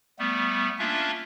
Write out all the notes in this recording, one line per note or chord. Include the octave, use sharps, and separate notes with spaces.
G3 A3 B3
A#3 C#4 D4 F4 E5